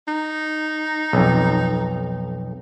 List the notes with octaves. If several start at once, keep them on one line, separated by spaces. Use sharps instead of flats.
D#4
B1 F2